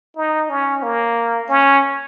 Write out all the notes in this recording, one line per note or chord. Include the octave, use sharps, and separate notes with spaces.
D#4
C#4
A#3
C#4